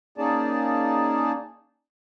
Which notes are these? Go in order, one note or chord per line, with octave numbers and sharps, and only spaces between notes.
A#3 C#4 D#4 G#4 D5 A5